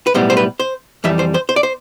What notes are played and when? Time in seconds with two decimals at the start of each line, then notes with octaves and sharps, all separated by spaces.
0.07 B4
0.14 B1 A2 G3 B3 C5
0.30 C5
0.37 B4
0.60 C5
1.04 F2 E3 G3 E5
1.19 C5
1.34 C5
1.49 C5
1.56 D5
1.63 C5